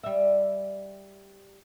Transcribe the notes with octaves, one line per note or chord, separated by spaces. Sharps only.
G3 E5